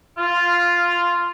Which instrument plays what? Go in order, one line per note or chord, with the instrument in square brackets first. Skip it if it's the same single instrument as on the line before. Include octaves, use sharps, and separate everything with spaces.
[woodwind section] F4